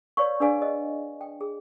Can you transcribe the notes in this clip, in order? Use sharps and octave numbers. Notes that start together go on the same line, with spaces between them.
B4 C#5 D5 F5 C#6
D4 G#4 B4 D5 F5 G#5
D#5
G5
G#4